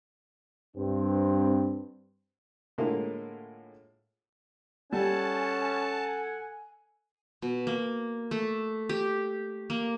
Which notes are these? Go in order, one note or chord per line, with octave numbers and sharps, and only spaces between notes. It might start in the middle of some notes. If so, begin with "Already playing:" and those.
G2 C4
A2 D3 G#3 A#3 E4 F4
G3 C#4 A4 F#5 G#5 A5
B2
A#3
A3
G4
A#3